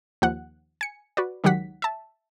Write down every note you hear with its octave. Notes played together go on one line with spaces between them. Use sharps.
D#2 F3 F#5 F#6
G#5 C#7
F#4 B4 D5
C#2 D#3 F#3 G4 F#5 B6
E5 A5